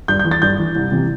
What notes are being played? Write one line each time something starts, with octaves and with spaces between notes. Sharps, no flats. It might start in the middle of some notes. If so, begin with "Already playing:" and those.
G2 G6
G6
E3
A6
G2 G6
E3
C2
C3 E3